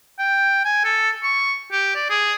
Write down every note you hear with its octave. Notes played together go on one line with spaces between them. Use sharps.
G5
G#5
A4
C#6
G4
D5
G#4